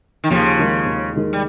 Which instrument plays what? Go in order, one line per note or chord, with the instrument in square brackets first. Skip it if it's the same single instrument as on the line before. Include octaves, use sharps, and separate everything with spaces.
[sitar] D#3
[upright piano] D#2 [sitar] C#3 F3
[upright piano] D#3 G#3
D#2
D#3 G#3
[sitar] G3